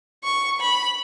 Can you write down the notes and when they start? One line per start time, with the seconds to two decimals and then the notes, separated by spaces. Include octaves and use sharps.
0.24 C#6
0.60 B5